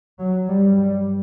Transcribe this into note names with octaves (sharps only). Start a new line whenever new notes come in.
F#3
G2 G3
G3